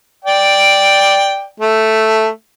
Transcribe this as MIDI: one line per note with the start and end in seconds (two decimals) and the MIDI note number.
0.25 1.47 74
0.25 1.47 79
1.60 2.27 57